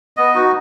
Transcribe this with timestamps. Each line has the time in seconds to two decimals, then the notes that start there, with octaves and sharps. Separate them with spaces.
0.17 B3 D#5
0.35 D#4 F#4